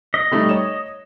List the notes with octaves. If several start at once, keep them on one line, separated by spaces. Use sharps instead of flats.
D#5
G3 A3 D#4
C#5 E7